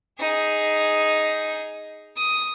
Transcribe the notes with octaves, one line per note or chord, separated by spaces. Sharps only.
D#4 G#4
D#6